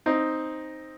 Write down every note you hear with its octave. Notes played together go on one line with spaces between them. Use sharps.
C4 D#4